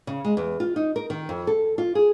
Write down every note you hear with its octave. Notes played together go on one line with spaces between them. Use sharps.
C#3
G#3
E2
F4
D#4
A#4
D#3
F2
A4
F4
G#4